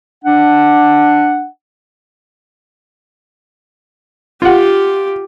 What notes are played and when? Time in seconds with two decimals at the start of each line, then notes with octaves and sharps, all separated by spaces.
0.25 D4 F#5
4.42 F4 G4 F#5